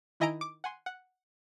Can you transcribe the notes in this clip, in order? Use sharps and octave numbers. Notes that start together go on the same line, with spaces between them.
D#3 E4 D#5 G#5 A#5 D7
D6
F#5 G#5 C6
F#5